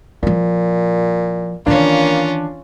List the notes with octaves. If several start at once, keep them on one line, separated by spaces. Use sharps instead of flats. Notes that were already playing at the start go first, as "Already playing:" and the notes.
A#2 F3 E4
D#3 E3 A#3 C#4 D4 F4